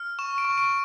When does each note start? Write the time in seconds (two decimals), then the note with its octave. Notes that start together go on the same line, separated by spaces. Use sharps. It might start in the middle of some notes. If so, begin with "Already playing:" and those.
Already playing: F6
0.19 C#6 E7
0.38 D7
0.45 C#6
0.58 D7